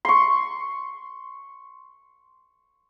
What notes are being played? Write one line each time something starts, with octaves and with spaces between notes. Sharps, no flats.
C6 C#6